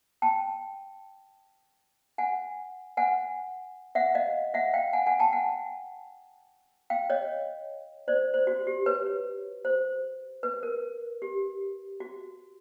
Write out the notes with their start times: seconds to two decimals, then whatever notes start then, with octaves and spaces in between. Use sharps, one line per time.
0.22 G5 A5
2.18 F#5 G#5
2.97 F#5 G#5
3.95 E5 F#5
4.15 D#5 F5
4.54 E5 F#5
4.74 F5 G5
4.93 F#5 G#5
5.06 F#5 G#5
5.19 G5 A5
5.33 F#5 G#5
6.90 F5 G5
7.10 C#5 D#5
8.08 C5 D5
8.34 C5
8.47 F#4
8.67 G4
8.86 B4 C#5
9.65 C5
10.43 B4
10.63 A#4
11.22 G4
12.00 F#4